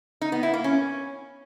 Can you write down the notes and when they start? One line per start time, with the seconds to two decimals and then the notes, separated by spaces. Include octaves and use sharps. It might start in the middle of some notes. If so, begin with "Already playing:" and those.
0.21 D#4
0.32 B3
0.43 E4
0.54 A#3
0.64 C#4